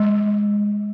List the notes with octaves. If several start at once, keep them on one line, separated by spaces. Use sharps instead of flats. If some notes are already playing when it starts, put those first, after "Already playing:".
Already playing: G#3